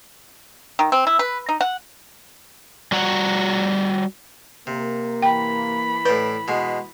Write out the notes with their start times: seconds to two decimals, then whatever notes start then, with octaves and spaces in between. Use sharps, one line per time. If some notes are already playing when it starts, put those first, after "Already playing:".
0.79 D#3
0.92 C4
1.07 E4
1.19 B4
1.49 D#4
1.61 F#5
2.92 G3 F#4 F#5 A#5
4.67 C3 A#3
5.22 E3 G5 B5
6.05 A2 B4 D5
6.48 B2 G#3